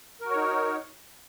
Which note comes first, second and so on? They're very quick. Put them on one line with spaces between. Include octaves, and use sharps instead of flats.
A#4 F#4 C#5 D#4